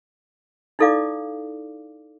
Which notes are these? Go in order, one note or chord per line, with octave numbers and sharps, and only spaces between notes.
D#4 E4 A4 D5 F5 D6